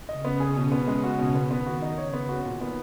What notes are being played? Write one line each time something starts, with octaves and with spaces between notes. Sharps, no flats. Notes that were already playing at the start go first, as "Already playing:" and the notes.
C#3 C#4 D#5
B3
G#4
B2
B3
G#3
F#4
B2
B3
D#3 B3
F#4
D#4
C#3 C#5
B3
F#4
A#2 D#3
B3